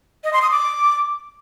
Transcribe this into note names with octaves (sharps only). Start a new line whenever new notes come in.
D#5
C6
D#6
D6